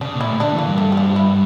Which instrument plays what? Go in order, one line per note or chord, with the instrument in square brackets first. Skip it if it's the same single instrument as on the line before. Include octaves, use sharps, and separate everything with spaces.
[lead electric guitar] C#3 [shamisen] D4
[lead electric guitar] A#2
[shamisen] E4
[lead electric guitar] A2
[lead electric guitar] D3 [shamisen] D4
[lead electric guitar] E3
[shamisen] A#3
[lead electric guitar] G2
[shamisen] A3
G3
F3
E4